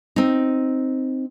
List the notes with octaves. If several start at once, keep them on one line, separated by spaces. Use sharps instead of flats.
C4 D#4